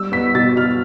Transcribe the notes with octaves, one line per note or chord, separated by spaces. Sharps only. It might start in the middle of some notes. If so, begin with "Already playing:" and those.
Already playing: G3 E6
B3 B6
B2 A6
B2 F6